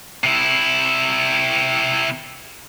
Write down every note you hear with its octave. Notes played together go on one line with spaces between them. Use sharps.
C3 E4